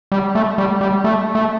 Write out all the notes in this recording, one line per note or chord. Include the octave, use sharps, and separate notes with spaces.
G3
A3
G3
G3
A3
A3